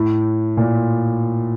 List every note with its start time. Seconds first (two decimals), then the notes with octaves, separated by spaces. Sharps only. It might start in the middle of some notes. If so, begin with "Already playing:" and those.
Already playing: A2
0.57 A#2